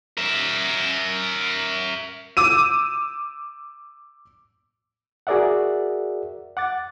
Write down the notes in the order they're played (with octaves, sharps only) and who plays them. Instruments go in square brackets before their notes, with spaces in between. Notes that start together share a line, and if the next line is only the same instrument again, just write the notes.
[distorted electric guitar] A#4 E5
[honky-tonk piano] D6 E6 D#7
[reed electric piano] F#4 G#4 A#4 D5 E5 F#5
F#5 D6 A6